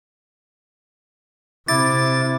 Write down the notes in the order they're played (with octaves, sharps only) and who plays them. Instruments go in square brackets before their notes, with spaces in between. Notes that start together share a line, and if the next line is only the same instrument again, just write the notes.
[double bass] C3 [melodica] E4 D6 [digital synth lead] A6